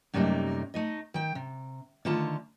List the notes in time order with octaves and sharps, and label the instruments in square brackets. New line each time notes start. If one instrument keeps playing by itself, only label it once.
[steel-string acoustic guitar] F#2 C3 G3 A3 A#3 D#4
A3 D#4 D#5
D#3 G5
C3
D3 D#3 A3 F4 A5